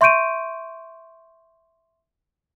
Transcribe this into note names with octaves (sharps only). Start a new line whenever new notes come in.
E5 C6 C#6 G6 D7 D#7